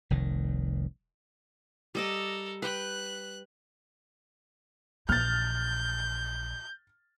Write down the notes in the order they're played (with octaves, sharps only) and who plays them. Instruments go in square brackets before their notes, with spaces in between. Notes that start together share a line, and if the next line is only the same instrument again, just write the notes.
[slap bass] F1 C2 D#3
[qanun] G3 D#5 D6 [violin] A4 A#4
[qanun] B4 G5 [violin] F#6
[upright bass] A#1 E3 [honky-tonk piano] F6 A6 [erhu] G6